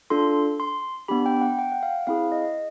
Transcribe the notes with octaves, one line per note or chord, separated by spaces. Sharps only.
D4 F4 A4 C6
C6
B3 D4 G4 B5
G5
F#5
G5
F#5
F5
C4 E4 G#4 F5
D#5